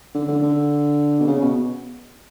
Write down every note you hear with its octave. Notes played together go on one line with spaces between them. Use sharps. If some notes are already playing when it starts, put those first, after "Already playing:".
D3
D3
D3
B2
C#3
B2